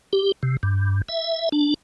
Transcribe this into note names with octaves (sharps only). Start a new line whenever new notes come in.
G4
C3
G2
E5
D4